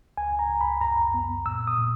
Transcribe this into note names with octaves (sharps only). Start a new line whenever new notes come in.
C#2 G#5
A#5
C#2
B5
F#2 A#5
B3
A#2 E6
D#6
A#2